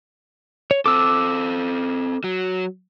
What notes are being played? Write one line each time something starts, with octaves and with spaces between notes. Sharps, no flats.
C#5
C4 A4 D6 E6
F#3